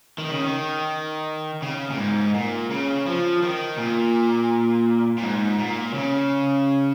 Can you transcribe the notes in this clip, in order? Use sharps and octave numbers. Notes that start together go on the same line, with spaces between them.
D#3
C#3
D#3
C#3
A#2
G#2
A#2
C#3
F3
D#3
A#2
A#2
G#2
A#2
C#3